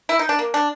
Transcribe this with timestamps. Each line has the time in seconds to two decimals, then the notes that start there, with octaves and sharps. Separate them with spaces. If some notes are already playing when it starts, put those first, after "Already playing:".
0.09 E4
0.19 D#4
0.29 D4
0.39 A#3
0.54 D4